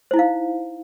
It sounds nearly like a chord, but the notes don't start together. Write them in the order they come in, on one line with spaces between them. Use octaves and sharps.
C5 E4 D#4 F5